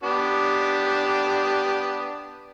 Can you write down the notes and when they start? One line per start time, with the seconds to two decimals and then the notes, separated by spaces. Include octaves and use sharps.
0.03 B3 D4 G4